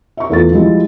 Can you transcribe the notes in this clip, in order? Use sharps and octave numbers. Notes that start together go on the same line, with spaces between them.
E5 C#6
E2 A3 F4 A6
F3 G3 G#3 E4